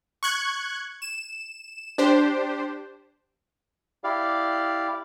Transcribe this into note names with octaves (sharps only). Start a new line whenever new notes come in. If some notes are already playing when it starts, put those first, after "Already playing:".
C#6 F#6 G#6
E7
D4 G4 C5
E4 G4 D5 F5